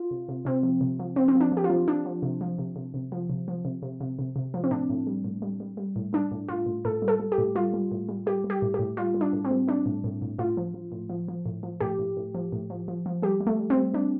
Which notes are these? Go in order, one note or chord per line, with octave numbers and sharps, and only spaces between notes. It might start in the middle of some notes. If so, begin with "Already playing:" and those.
Already playing: F4
C3
C3
C3 C4
F3
C3
F3
F3 C4
C4
F3
D4
F3 G4
F4
F3
F3 D4
F3
C3
F3
C3
C3
C3
F3
C3
F3
C3
C3
C3
C3
C3
F3
C4
A2 D4
A2
G3
A2
G3
G3
G3
A2
G3 D4
A2
A2 F4
A2
A2 A4
G3
A4
G3
G4
A2
G3 F4
G3
A2
G3
G3 G4
G3
G4
A2
A2 G4
G3 F4
G3
D4
A2
C4
G3
G3 D4
A2
A2
A2
A2 F4
F3
F3
A2
F3
F3
A2
F3
A2 G4
A2
A2
F3
A2
F3
F3
F3
G3 G4
G3
A3
G3
C4
G3
G3 D4